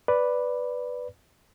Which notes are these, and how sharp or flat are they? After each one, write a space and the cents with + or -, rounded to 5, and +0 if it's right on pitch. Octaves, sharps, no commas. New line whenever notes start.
B4 +0 D5 +0